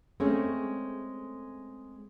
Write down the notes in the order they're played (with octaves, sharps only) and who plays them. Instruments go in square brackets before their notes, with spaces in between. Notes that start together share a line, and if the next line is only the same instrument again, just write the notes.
[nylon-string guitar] G#3 A3 C4 C#4